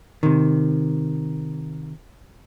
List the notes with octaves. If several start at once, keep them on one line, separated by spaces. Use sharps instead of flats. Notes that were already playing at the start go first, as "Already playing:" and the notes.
C3 D#3